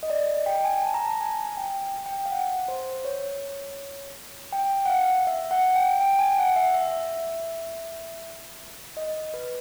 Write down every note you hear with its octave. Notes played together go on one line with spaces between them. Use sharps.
D#5
D5
D#5
G5
G#5
A5
A#5
A5
G#5
G5
G5
F5
F#5
C5
C#5
G5
F#5
F5
E5
F#5
G5
G5
G#5
F#5
E5
E5
D#5
B4